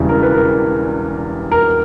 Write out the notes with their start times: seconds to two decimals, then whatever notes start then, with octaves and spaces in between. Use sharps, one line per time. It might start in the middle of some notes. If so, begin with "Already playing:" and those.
Already playing: E1 E2 C#3 E3 G3
0.09 A#4
0.22 B4
0.35 A#4
1.52 A#4